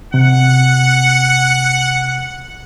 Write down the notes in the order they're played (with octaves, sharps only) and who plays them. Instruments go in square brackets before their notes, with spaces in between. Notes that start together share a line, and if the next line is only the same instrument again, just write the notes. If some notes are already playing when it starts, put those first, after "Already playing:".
[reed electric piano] C3 [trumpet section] F#5